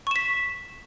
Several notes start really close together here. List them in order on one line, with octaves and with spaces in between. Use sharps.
C#6 E7 B6